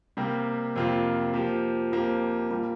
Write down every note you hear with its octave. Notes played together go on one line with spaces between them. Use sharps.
C3 G3 A#3
F2 C3 A#3 F4
F3 A#3 G4
F2 F3 A#3 G4
A#2 G3 A#3